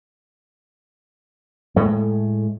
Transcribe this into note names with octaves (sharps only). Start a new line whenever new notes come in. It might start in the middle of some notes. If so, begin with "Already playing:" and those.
A2 G#3 A3